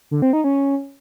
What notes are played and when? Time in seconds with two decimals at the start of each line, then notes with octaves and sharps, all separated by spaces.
0.11 D3
0.22 C4
0.33 D#4
0.44 C#4